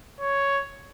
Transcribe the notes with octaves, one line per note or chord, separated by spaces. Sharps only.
C#5